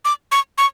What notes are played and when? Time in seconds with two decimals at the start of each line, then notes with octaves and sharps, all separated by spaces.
0.05 D6
0.32 C#6
0.58 C#6